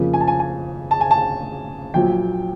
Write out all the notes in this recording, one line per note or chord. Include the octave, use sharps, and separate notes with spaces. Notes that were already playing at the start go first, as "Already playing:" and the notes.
Already playing: F2 C#3 F3 A#3
G#5
A5
G#5
G#5
A5
G#5
A5
A#1 A#2 F#3 G5